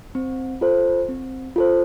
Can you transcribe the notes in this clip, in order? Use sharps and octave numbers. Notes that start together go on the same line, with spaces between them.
C4
F4 A4 C5
C4
F4 A4 C5